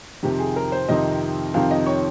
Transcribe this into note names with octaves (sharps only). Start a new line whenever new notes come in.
F2 C3 D#3 G4
G#4
A#4
C5
F2 C3 D#3 D#5
F2 C3 D#3 F5
D#5
C#5